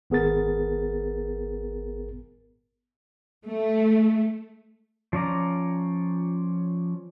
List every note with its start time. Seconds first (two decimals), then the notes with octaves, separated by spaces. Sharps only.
0.10 G#1 B3 G#4 A#4 A6
3.46 A3
5.13 F3 C#4 D5 A#5